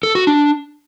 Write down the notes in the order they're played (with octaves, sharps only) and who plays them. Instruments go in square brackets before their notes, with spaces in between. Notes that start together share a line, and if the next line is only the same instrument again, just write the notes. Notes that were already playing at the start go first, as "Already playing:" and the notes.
[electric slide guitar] A4
F#4
D4